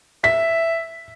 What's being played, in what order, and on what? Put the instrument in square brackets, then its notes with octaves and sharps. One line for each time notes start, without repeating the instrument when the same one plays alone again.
[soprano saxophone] E5 [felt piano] B6